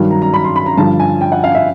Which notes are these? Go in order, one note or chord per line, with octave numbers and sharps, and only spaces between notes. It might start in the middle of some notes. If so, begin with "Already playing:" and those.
Already playing: G2 D#3 F#3
A#5
A#5
B5
C6
B5
A#5
G2 D3 F3 A5
G#5
G5
F#5
F5
E5